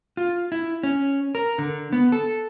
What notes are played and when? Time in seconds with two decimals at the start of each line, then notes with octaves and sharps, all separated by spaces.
0.17 F4
0.52 E4
0.83 C#4
1.35 A#4
1.58 D3
1.93 B3
2.12 A4